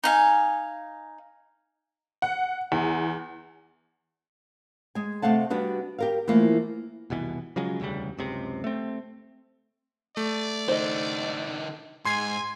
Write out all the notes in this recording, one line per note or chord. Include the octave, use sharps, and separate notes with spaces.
D#4 F5 G#5
F#5
E2
G#3 G#5
C3 A3 F5 F#5 A5
G3 B3 D4 F#4
G4 A#4 F5
E3 F3 A3 A#3
F1 C2 B2 E3
C#3 F3 F#3 G#3
E1 D2 C#3 G3
F#1 C#2 C3
A3 C4
A3 D5
D3 D#4 C5 D#5
G#2 G#5 C6 G#6 C7